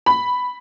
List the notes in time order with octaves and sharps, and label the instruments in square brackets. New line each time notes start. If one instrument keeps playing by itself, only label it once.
[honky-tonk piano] B5